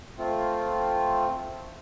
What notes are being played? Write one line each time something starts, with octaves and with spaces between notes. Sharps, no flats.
A3 C4 F4